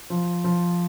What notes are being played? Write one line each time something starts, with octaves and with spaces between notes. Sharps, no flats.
F3
F3